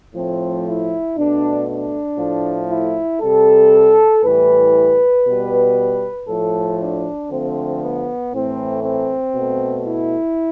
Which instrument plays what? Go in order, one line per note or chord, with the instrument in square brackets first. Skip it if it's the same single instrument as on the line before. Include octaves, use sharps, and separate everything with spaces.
[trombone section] A2 F3 A3 C4
E4
B2 A3 D4
D4
A2 F3 A3
E4
C3 G3 A4
A2 E3 G3 B4
B2 G3
A2 F3 A3 A4
D4
D3 F3 A3 C4
B3
A2 E3 A3 C4
C4
B2 A3
E4